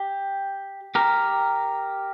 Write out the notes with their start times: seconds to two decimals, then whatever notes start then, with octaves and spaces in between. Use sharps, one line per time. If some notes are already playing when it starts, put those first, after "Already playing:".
Already playing: G4
0.95 G4 A#4